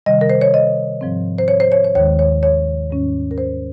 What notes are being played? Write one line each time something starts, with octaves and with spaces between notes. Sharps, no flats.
C3 D#3 G3 D#5
A#4
C5
C#5
D#5
G#2 F3 C4
C5
C#5
C5
C#5
C#5
D#2 D#3 G#3 C#5
C#5
C#5
G#2 D#3 G3 C#4
A#4
C5